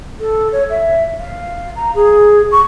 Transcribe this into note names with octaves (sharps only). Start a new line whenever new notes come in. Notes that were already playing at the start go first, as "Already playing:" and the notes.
A4
C#5
E5
F5
A#5
G#4
C#6